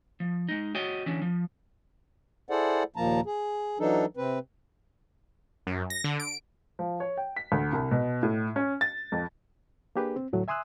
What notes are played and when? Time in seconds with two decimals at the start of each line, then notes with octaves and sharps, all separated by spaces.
0.20 F3
0.49 G#3 D#4
0.75 F#4 C#5 D#5 G5
1.06 E3 C#4 D4
1.22 F3
2.49 E4 G#4 A4 C5 D5 F#5
2.96 D#2 A#2 F3 A#3 A5 A#5
3.26 G#4
3.79 E3 F#3 D4 D#4 A4
4.17 C3 C4 B4
5.67 F#2
5.90 A#6
6.04 D3
6.19 D7
6.79 F3
7.00 C#5
7.17 G5
7.36 B6
7.52 D2
7.73 C2
7.91 B2
8.23 A2
8.56 C#4
8.81 A6
9.12 F2
9.96 A#3 D4 G4 G#4 B4
10.16 C4
10.33 D2 A2 F#3 A3
10.48 E5 G#5 C6 D#6 E6 F#6